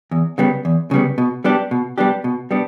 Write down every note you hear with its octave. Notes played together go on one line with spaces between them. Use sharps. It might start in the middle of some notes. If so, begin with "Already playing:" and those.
E2
C#3 G3 B3
E2
C#3 G3 B3
B2
G3 B3 D4 G4
B2
G3 B3 D4 G4
B2
G3 B3 D4